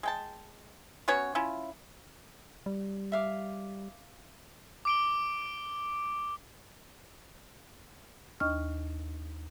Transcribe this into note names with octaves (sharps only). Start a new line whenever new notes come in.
G#3 G5 A5
B3 C#4 F#4 C#5
C#4 E4 F4
G3
E5 F5 D6
D6 D7 G7
D#2 D4 D#5 C#6 F6